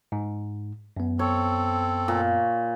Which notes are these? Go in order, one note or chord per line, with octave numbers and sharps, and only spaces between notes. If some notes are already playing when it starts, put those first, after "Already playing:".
G#2
F#2 B3
C4 A4 C#5
A#2